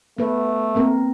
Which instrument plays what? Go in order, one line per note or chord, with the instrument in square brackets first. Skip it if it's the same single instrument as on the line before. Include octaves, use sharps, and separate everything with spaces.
[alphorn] A3 [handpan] B3 B4
[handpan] A#3 C4 A#4